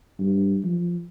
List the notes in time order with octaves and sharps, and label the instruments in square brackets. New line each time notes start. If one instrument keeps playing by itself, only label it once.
[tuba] G2
F3